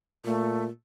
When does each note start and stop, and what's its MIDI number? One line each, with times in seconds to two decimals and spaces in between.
0.25 0.70 46
0.25 0.65 57